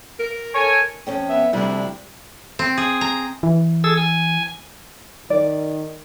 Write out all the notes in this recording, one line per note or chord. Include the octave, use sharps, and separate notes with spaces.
A#4
A4 C#5 G#5
F2 C#4 G5
B3 E5
D2 C3 F3 G3 D4 E4
C4
G#4
A#5
E3
G#4 A4 E6
G#5
D#3 D5